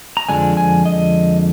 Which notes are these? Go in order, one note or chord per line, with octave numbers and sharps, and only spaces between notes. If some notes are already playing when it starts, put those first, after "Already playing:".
A#5
F2 D3 F3 G#3 D4 G#5
G#5
D#5